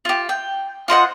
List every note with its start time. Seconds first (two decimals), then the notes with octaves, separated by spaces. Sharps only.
0.05 F4 G4
0.29 G5
0.88 F4 C5 D#5 F#5